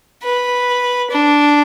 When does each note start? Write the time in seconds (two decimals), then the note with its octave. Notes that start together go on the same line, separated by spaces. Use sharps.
0.24 B4
1.11 D4